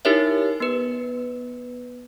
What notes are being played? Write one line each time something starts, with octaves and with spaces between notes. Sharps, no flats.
D#4 E4 G4 A#4 C#5 E5
B3 B4